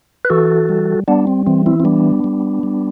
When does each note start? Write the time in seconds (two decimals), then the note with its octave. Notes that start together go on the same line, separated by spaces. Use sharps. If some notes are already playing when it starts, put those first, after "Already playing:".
0.25 B4
0.30 E3 F#4 A4
0.69 G3
1.08 G3 B3 D4
1.27 C4
1.46 E3 C4
1.66 C4 E4
1.80 C4
1.85 G3 B3 D4
2.24 G3
2.63 G3